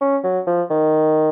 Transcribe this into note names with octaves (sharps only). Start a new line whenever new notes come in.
C#4
F#3
F3
D#3